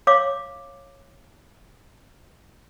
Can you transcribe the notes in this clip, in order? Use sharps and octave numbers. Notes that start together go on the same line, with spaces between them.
C#5 F5 D6